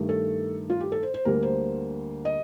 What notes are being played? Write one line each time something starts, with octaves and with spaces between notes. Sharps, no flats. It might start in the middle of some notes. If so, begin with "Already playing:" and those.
Already playing: G2 D#3 A3
A4
F4
G4
A4
C5
C5
D2 D3 G3 A#3 A#4
C5
D#5